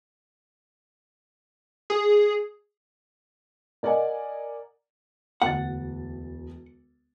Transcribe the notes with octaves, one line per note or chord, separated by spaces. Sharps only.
G#4
A#4 D5 D#5 F#5 G#5
E1 D2 F#5 A6